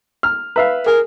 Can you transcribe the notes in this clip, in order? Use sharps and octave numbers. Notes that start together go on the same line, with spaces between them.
F6
B4 E5 F5
G#4 A#4